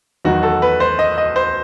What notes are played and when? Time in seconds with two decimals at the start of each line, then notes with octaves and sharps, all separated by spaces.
0.25 E2 D#3 F#3 F#4
0.43 A4
0.62 B4
0.80 C5
0.99 D#5
1.18 D#5
1.36 C5